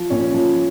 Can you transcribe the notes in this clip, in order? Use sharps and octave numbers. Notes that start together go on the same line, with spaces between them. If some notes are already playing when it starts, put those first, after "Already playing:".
Already playing: F3
A#2 C#4
F3